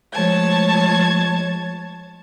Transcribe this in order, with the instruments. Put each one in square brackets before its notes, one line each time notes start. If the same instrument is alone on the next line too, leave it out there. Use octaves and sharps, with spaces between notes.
[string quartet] F3 G#3 A3 C#5 A5 G#6